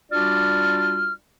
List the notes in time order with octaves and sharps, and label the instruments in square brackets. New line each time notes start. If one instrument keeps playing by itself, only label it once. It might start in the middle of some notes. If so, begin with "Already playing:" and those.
[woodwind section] G3 D4 F4 F#4 D5 F6